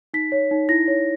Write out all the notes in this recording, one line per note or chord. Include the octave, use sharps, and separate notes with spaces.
D#4 B6
C#5
D#4
E4 A#6
C#5